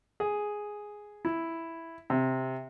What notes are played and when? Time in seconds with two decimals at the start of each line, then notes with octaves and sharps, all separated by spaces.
0.20 G#4
1.25 E4
2.10 C3